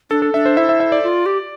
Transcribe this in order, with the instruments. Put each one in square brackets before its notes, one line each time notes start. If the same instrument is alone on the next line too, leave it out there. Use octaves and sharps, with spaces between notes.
[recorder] D4 [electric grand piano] A4
[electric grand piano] A4
[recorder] D4 [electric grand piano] E5
[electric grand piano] C5
[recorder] E4 [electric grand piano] E5
[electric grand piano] E5
E5
D5
[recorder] F4
G4